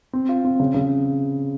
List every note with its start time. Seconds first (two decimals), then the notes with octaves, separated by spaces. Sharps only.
0.13 C4
0.29 F4
0.44 C4
0.60 C#3
0.74 C#3